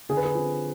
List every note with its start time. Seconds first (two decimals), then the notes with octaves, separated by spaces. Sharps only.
0.09 D3 G#4
0.17 B4
0.25 G#4
0.35 F3 C4